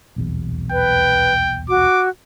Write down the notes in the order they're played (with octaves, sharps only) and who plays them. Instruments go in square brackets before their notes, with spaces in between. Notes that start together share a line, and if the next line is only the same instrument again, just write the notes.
[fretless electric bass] D#1 B1 E2
[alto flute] B4 [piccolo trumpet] G5
[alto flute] F#4 [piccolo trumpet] D6